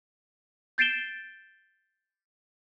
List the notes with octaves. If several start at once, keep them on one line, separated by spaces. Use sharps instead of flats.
G6 A6 C7 D7 E7 G7